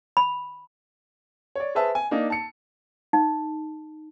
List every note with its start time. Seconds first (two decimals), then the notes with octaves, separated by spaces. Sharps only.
0.17 B5
1.56 C#5 D5
1.75 G#4 B4 C5 E5 A5
1.95 G#5
2.11 A#3 D4 D#4
2.30 A5 C#7
3.13 D#4